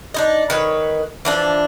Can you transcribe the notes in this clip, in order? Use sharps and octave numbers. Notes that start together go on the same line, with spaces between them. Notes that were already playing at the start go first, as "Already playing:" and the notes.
D4 D#4 D#5
D#3 B4 C#5
E3 F3 D4